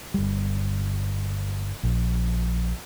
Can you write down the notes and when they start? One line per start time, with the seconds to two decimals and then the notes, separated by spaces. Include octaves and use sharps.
0.14 G1 G3
1.83 A#1